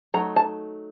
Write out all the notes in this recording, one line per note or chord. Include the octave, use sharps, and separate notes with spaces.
F#3 A3 D#4 A#5
A5